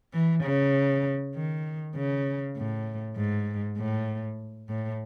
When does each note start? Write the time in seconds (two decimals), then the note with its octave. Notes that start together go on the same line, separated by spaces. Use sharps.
0.14 E3
0.44 C#3
1.35 D#3
1.96 C#3
2.57 A2
3.17 G#2
3.77 A2
4.69 A2